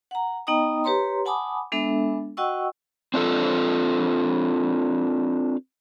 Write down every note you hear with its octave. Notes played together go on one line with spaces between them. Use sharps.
F#5 A#5
B3 D#4 D#5 G5 A#5 D#6
G4 B4 C#5 A#5 C6
F#5 G#5 A5 B5 D6 D#6
G#3 B3 D4 A4 E5
F#4 D#5 F#5 G5 C#6 E6
C4 D4 F4 A4